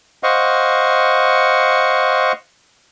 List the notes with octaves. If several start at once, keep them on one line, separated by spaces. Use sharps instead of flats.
C5 D#5 F5 F#5 C#6